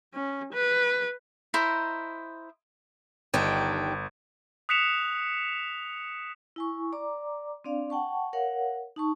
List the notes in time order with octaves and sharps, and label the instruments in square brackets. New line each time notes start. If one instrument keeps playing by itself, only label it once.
[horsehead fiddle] C#4
B4
[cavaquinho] E4 C5 D#5 A#5
[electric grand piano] G1 [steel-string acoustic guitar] D#3 D4 G4
[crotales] D#6 F#6 B6 C#7 E7 F7
[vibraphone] E4 G#5 C#6
D5 A#5 D6
C4 D4 D5 F5
F#5 G5 A5 C#6
A#4 C#5 F5 F#5
D#4 A5 C#6